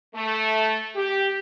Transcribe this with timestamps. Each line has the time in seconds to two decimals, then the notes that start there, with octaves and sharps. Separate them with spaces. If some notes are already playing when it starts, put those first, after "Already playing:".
0.15 A3
0.96 G4